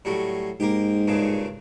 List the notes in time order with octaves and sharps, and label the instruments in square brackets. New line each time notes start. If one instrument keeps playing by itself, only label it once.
[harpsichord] A2 F#3 G3
[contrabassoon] G#2 [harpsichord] A#3 G4
[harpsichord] G2 A#2 C#3